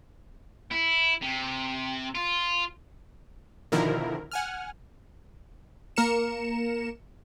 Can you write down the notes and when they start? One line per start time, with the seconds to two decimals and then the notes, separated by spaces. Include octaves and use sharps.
0.72 E4
1.22 C3
2.15 F4
3.72 B2 D3 D#3 F3 E4 A#4
4.31 F#5 G#5 F6
5.96 A#3 A#4 C#7 E7